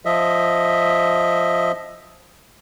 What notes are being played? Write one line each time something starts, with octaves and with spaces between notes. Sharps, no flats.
F3 D#5 E5